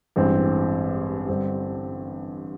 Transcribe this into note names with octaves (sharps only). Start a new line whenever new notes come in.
A1 G2 E3 G#3 C4
G2 D3 G3 C4